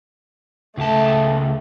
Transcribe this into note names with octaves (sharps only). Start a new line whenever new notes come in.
C#2 A3 A5